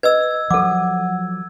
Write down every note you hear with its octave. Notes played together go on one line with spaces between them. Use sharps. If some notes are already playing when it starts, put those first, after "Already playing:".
B4 D#5 E6 G#6
F3 F#3 A4 F#5 D6